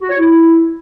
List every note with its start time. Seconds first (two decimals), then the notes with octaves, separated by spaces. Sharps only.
0.01 F#4
0.10 C#5
0.19 E4